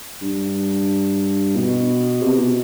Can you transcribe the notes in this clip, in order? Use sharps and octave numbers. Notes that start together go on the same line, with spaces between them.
G2
B2
C3
B2